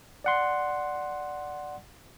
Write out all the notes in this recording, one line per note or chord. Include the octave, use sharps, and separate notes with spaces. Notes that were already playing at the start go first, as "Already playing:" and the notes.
D5 F#5 C6